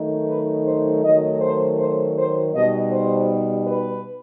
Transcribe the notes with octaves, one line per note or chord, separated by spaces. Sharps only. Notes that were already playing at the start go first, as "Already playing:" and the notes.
Already playing: D#3 F#3 A3 D#4
B4
C5
D#3 F#3 A3 D#5
C5
C5
C5
B2 G3 D#4 D#5
C5
B4